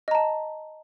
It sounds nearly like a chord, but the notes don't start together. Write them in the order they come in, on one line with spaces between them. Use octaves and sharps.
D#5 A#5 A5